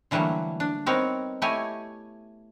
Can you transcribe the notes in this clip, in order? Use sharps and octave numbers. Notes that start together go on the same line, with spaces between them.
D3 E3 F#3 G3 A3 A#3
D4
B3 C4 D#4 A#4 C#5
A3 E4 G4 C#5 D#5 G#5